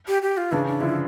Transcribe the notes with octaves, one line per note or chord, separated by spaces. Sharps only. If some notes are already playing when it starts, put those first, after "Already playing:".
G4
G4
F4
C#3 E3 D4
D4
D3 F3 E4